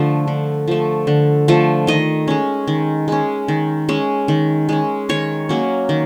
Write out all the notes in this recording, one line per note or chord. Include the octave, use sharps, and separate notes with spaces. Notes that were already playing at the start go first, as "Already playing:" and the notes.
Already playing: D3 F3 A3
D3
F3 A3
D3
F3 A3
D#3 D#5
G#3 C#4
D#3
G#3 C#4
D#3
G#3 C#4
D#3
G#3 C#4
D#3 C#5
F#3 A#3 C#4
D#3